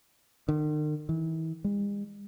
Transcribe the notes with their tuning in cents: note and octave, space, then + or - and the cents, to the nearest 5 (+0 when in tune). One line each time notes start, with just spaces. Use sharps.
D#3 -45
E3 -35
G#3 -45